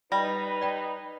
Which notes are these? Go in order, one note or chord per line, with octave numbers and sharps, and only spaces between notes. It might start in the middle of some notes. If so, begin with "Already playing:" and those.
G3 D#4 B4 A#6
D5 G5 B5